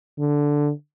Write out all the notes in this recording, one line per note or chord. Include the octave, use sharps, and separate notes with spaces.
D3